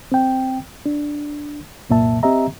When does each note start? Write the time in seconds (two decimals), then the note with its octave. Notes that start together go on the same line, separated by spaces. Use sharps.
0.12 C4 G5
0.86 D4
1.89 C2 F#2 A#2 A#3 E5 A5
2.23 C4 G4 D#5 E5 A#5